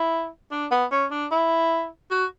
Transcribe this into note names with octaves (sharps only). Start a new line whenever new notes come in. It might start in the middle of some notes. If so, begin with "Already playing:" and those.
Already playing: E4
D4
B3
C#4
D4
E4
F#4